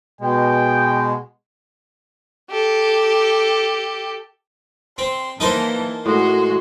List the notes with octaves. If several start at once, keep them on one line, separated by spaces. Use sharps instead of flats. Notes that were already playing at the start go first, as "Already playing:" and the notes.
B2 G#3 G5
G4 A4
C4 C6
E3 A#3 D#4 A#4 C5 A5
A2 G#3 F#4 C6